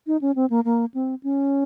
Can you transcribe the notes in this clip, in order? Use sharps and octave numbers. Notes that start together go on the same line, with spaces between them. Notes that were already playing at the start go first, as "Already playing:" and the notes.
D#4
C#4
C4
A#3
A#3
C4
C#4